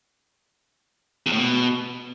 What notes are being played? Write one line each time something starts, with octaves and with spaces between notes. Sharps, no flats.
E2
A2
B2